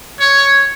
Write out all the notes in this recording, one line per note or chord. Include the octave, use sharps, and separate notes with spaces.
C#5